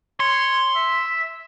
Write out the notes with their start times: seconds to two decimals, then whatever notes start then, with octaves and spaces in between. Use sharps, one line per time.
0.20 C#5 C6
0.76 E5